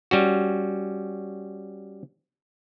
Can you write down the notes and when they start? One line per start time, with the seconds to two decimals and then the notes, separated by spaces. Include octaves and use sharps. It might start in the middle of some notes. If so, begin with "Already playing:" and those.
0.11 G3 C#4 F#4